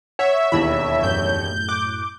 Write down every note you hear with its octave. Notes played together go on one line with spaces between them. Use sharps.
C#5 E5 F#5
E1 D#2 E3 B5 E6
F#2 A2 G6
D6 F#6